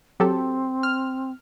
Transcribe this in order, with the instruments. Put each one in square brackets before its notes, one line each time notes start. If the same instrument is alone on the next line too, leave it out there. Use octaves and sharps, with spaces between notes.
[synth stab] F#3 G4 A4 [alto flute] C4
[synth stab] F6